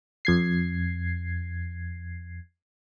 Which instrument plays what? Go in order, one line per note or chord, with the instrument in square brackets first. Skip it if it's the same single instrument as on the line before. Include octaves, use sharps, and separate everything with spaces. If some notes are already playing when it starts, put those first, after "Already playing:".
[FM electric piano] F2 G#6 C7